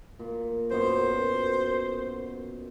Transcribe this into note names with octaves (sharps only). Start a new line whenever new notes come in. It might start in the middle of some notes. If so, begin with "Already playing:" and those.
A#2
F#2 B2 C5 C#5